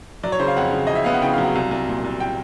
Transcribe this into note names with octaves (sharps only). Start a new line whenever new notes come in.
F#3 D5
C#5
C#3 C5
F5
F2 F#5
C#3
F2 D#5
E5
B3 F5
F#5
C#3 G5
F5
F#3
F#5
C2 F5
C2
A#2
C2
G5